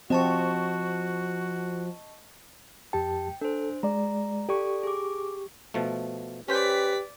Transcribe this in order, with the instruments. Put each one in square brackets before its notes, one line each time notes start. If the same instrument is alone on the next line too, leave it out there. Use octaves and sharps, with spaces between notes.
[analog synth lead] F3 [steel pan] C4 [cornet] F#4 [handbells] D#5 A5 C#6
[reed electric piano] F2 G4 A5 [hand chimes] G5
[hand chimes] D4 C5 [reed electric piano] A4
[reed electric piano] G#3 D5 [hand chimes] A#5
[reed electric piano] G4 C#6 [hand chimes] A4 D5
[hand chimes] G#4 D6
[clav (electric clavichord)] B2 F3 A3
[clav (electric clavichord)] C#4 C5 G5 [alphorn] G4 [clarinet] B4 [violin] D5 B6